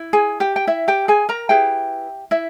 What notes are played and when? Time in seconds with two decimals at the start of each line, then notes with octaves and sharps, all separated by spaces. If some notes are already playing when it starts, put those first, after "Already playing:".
Already playing: E4
0.13 G#4 G#5
0.40 G4 G5
0.56 G5
0.67 E4 E5
0.88 G4 G5
1.08 G#4 G#5
1.29 A#4 A#5
1.49 E4 G4 G#4 B4 G5
2.31 E4 E5